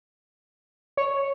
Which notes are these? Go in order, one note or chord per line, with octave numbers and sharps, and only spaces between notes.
C#5